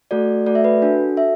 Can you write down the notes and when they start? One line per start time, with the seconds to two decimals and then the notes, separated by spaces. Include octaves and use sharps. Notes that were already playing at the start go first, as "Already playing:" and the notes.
0.11 A3 F#4 A4 D5
0.46 A3 F#4 A4 D5
0.55 E5
0.64 B4
0.82 D4 F#4 A4
1.17 F#4 A4 E5